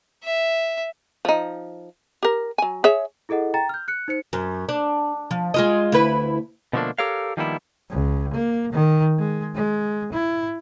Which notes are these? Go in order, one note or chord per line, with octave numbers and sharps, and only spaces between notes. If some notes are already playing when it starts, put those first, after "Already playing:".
E5
F3 D#4
G4 A#4
F#3 G#5
G#4 C#5 E5
E4 G#4 A4 D#5 F#5
G5 A#5 A6
F6 G6
F#6 C#7
D#4 C5 C#7
F#2
D4
F3
G#3 F4 D#5
D2 E4 B4
B2 D3 F3 A3 A#3 D4
G4 A4 A#4 C#5 F5
D#3 F3 G3 A#3 B3 E4
C#2
A#3
D#3
G#3
G#3
E4